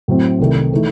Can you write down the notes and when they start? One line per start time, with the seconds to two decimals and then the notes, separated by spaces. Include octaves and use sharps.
0.08 A2 F#3 C4
0.39 C2 C3 D#3 A3
0.73 E3 A3 D#4